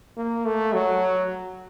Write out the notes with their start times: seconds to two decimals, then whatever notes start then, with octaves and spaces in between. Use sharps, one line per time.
0.17 A#3
0.46 A3
0.73 F#3